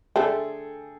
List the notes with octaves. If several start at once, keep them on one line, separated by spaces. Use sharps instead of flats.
D3 A3 G#4 A4 G5